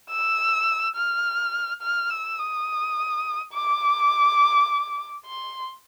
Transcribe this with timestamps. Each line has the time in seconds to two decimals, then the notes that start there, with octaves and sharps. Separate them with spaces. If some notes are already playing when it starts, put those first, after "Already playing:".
0.11 E6
0.96 F6
1.82 F6
2.10 E6
2.39 D#6
3.54 D6
5.26 C6